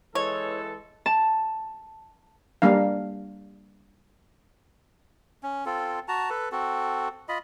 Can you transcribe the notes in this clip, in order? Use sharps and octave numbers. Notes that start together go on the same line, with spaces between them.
E3 G#3 A4 C#5
A5
G3 A#3 D4 F5
C#4
C4 F4 A4
F#4 A5 A#5
A4 B4
C4 F#4 A4
F4 D#5 B5